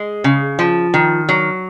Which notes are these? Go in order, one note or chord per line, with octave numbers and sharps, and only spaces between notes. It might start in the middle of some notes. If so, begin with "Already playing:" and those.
Already playing: G#3
C#3
F3
D#3
F#3